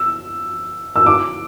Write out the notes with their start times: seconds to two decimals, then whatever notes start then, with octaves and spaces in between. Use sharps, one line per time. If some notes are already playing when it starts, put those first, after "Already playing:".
Already playing: E6
0.96 E6
1.06 D6